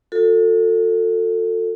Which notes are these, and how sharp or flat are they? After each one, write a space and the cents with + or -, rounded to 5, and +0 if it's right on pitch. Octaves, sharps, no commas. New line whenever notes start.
F#4 -45 A4 +25